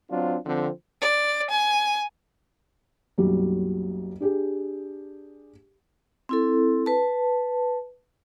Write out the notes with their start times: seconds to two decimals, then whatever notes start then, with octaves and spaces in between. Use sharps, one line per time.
0.11 F#3 C4 D4 F4
0.46 D3 F3 C4
1.01 D5
1.50 G#5
3.18 F#1 B1 F#3 G3
4.20 D4 G4 G#4
6.29 C4 E4 A4
6.86 B4 A5